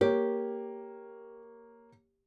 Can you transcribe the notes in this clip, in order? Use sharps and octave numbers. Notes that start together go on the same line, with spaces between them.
A#3 G4 C#5